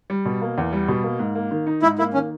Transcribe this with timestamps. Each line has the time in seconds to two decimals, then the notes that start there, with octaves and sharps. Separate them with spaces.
0.10 G3
0.25 B2
0.42 A#3
0.58 E2
0.73 G3
0.88 B2
1.04 A#3
1.19 G#2
1.35 A#3
1.51 D#3
1.67 D#4
1.82 G#2 E4
1.99 A#3 E4
2.14 D#3 C#4